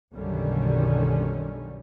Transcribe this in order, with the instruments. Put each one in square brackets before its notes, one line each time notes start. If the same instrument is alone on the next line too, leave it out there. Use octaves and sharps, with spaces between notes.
[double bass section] B1 F#2 D3 D#3 G3 C#4